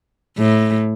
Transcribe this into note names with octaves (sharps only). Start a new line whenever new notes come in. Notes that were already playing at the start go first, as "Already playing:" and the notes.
A2